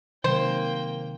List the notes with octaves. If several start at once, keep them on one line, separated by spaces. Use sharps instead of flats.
C3 D#3 F#3 A#3 C5 G5